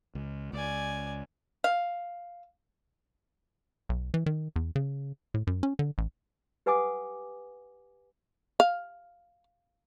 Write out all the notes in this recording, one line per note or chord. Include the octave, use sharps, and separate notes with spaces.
C#2
C#2 D5 G#5
F5
B1
E3
D#3
E2
C#3
A2
F#2
C#4
D3
A1
G4 B4 F#5 G#5 D6 D#6
F5